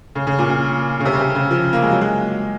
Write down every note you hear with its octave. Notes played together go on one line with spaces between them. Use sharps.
C#3
C#3
A#2
A#2
C#3
C3
C#3
C3
C#3
F3
A#3
G#3
F#3
G#3